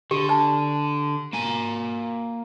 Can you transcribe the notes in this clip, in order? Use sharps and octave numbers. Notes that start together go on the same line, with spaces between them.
D3 G4
A5
A#3 G#5